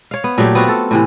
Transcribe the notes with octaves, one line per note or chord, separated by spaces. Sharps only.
C#5 F5
B3
A#2 F#3 A3 G4
B3 C4 F4 F#4
A4
A2 C3 E3